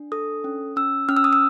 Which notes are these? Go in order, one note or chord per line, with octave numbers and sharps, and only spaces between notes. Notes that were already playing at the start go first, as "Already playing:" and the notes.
Already playing: D4
A4 D#6
C#4
C#4 E6
C#4 F6
E6
D#6
E6